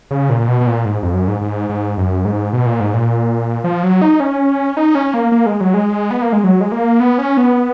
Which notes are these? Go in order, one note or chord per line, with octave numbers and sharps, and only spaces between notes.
C#3
A#2
A#2
B2
B2
A#2
G#2
F2
F#2
G#2
G#2
G#2
F#2
G#2
B2
A#2
G#2
A#2
F3
F#3
D#4
C#4
D#4
C#4
A#3
A#3
G#3
F#3
G#3
B3
A#3
G#3
F#3
G#3
A#3
B3
C#4
B3